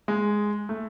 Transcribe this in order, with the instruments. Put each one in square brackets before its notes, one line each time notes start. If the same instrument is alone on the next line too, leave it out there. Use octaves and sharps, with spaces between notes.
[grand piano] G#3
A3